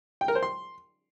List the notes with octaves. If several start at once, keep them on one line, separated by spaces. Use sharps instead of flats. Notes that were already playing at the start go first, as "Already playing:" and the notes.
G5
A#4
C5
C6